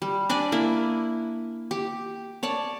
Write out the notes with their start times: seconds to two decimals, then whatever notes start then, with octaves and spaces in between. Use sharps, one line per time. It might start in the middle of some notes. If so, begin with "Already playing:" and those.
0.02 G3
0.29 D4 D5 G#5 B5
0.52 A#3 E4
1.71 G4
2.43 C#5 D5 A5